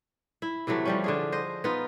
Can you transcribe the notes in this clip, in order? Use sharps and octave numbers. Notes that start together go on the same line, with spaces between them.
E4
C3 E3 F#3 A3
F3 G3 C#4
D3 F4 G#4
C5 D#5
B3 D#4 F4